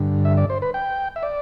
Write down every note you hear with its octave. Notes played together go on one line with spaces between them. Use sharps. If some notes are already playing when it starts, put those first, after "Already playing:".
Already playing: G2 D3
E5
D5
C5
B4
G5
E5
D5